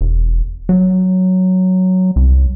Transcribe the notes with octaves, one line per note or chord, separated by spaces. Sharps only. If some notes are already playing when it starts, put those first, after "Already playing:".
E1
F#3
C2